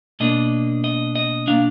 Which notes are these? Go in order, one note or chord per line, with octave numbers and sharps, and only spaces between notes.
B2 A#3 D4 D#5
D#5
D#5
B2 A#3 D4 F5